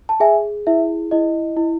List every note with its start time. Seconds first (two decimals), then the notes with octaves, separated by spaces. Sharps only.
0.09 A5
0.20 G#4 E5 G#5
0.67 E4 E5
1.11 E4 D#5
1.57 E4